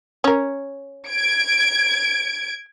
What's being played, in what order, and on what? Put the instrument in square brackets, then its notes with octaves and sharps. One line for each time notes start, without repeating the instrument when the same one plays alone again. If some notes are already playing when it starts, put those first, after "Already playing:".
[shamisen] C#4 A#4
[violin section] G#6 D7